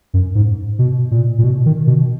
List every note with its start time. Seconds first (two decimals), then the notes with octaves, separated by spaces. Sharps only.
0.14 F#2
0.35 G#2
0.79 B2
1.11 A#2
1.38 A#2
1.44 B2
1.66 D#3
1.87 B2